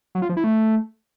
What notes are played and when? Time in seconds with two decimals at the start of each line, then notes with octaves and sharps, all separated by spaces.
0.15 F#3
0.22 F4
0.29 F3
0.37 E4
0.44 A3